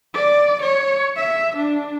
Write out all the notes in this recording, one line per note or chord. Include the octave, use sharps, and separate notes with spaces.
D5
C#5
E5
D4